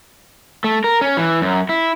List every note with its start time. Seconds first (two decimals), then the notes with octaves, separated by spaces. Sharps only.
0.64 A3
0.84 A#4
1.01 C#4
1.17 E3
1.41 F#2
1.69 E4